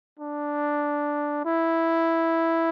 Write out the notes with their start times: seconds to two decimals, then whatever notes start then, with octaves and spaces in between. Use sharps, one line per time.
0.19 D4
1.44 E4